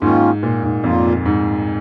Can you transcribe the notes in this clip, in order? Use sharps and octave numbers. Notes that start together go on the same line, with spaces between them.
G#2 D#3 A#3 C#4 F4
A#2
G#2
F2 A#2 A#3 F4
G#2